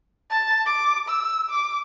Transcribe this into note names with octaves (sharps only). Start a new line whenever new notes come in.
A5
D6
E6
D6